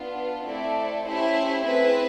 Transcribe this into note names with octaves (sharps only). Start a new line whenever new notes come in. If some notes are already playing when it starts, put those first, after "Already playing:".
Already playing: B3 D4 F4
A3 C4 E4 A4 D5
A3 C#4 E4 G4 C5
C4 E4 G#4 B4